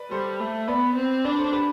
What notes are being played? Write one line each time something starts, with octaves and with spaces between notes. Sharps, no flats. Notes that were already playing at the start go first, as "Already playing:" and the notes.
Already playing: B4 D5
G3 A4 C5
A3
B3 B4 D5
C4
D4 B4 D5
A4 C5
G4 B4